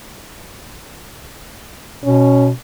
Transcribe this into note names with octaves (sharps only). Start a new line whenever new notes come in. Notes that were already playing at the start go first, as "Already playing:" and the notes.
B2 C#4